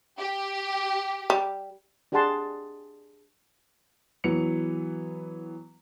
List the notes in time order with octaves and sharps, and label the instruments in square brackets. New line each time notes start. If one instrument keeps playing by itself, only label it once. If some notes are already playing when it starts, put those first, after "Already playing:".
[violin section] G4
[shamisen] G3
[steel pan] D4 G4 G#4 F#5 A5 C6
[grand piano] E3 F#3 B3 C#7 F7